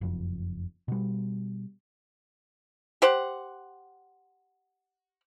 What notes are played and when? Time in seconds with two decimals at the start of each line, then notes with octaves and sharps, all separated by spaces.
0.01 F#1 F2
0.88 B2 G3
3.02 G4 C5 F#5